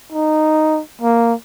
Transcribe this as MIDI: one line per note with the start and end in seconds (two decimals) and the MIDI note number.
0.12 0.80 63
1.01 1.33 58